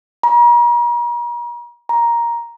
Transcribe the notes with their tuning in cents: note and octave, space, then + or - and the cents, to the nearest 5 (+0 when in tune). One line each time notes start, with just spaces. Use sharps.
A#5 +40
A#5 +10